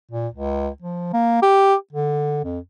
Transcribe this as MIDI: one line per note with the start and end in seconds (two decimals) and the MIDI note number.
0.12 0.28 46
0.34 0.69 37
0.82 1.11 53
1.13 1.41 58
1.43 1.75 67
1.93 2.43 50
2.45 2.59 41